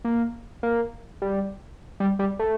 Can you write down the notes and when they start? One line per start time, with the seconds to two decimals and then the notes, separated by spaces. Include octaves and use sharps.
0.05 A#3
0.63 A#3
1.22 G3
2.00 G3
2.19 G3
2.39 A3